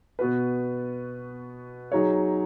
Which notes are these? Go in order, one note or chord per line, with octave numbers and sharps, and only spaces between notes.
B2 B3 F#4 B4
F#3 D#4 G#4 C#5